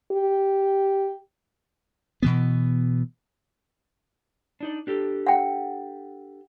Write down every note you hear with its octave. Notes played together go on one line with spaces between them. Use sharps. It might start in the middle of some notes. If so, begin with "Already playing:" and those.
G4
B2 E3 B3
D4 D#4 D5
D4 G4 A4
F#5 G5